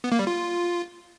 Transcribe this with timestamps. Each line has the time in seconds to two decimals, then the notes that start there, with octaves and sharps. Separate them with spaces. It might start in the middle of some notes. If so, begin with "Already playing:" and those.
0.04 B3
0.12 A#3
0.19 G3
0.27 F4